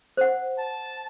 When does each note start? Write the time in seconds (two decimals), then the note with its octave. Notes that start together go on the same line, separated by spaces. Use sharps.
0.17 C5 F#5
0.59 A5